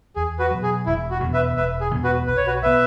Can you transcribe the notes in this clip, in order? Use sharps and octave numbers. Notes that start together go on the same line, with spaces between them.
E2 G#4
F#4 B4
B2 F#3
G#4
E1 E4
F#4
E2 B2 B3
B4 E5
E1 B4 E5
G#4
E2 B2 B3
F#4 B4
B1 B4
C#5
F#4 B4
B2 B3 B4 E5